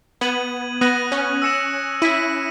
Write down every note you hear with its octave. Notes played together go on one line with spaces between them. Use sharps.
B3 G#6 D#7 F#7
B3 D#6 F#6 A#6 D#7 F#7
C#4
E6 A#6 C#7 E7
E4 E6 B6 D#7